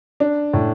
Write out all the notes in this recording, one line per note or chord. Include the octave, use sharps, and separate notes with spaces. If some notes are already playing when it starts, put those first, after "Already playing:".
D4
A2